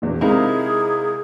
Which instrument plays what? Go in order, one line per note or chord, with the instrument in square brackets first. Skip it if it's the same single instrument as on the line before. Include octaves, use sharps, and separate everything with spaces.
[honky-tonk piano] A#1 E2 B2
[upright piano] C3 A#4 F5 [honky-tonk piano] G#3 C4 [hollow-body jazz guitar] D#4 E4 [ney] G#4